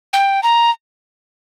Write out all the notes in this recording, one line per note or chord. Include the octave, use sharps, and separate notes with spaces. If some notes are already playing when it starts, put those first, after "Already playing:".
G5
A#5